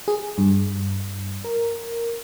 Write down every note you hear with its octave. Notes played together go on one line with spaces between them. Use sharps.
G#4
G2
A#4